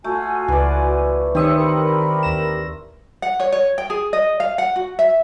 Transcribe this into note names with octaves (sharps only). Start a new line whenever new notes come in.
A3 F4 F#4 G#5
C#2 E3 D5
D#3 C4 G4 C#5 E5 D#6 C#7
G4 A#4 B5
D#2 A#6 E7
F#5
C#5
C#5
G5
G#4
D#5
F5
F#5
F#4
E5